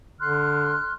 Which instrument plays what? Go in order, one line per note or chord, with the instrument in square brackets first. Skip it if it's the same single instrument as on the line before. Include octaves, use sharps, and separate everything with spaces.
[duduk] D3 [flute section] C6 F6 F#6